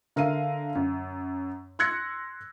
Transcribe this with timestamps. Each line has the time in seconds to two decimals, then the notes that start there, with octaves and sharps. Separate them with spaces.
0.16 D3 A#4 E5 F5 D#7
0.75 F#2
1.79 C6 E6 F#6 G#6 A#6 C#7